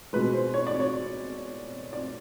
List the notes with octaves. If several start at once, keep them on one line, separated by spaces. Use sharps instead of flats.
B2 G#3 B4
C5
C#5
D5
C#5
D5